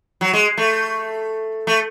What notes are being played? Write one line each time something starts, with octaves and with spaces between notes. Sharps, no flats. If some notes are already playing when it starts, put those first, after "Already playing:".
F#3
G#3
A3
A3